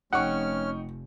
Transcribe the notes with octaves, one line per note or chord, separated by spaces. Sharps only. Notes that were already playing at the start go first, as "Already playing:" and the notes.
F1 C#4 D#4 F#5 G5 C#6 F6